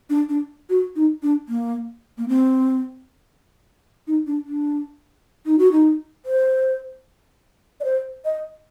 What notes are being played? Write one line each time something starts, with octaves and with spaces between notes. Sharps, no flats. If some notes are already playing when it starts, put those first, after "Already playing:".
D4
D4
F#4
D#4
D4
A#3
A#3
C4
D#4
D4
D4
D#4
F#4
D#4
C5
D5
C5
D#5